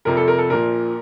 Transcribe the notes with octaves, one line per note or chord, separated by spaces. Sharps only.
F1 F2 C3 F3 A#4
A4
A#4
A4
A#1 A#2 F3 A#4